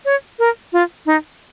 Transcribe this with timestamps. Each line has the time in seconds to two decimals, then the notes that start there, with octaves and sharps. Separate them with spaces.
0.05 C#5
0.39 A#4
0.73 F4
1.06 D#4